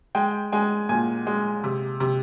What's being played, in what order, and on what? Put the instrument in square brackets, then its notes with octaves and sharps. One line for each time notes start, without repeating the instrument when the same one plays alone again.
[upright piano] G#3 G5
G#3 G#5
A#2 G#5
G#3
C3
C3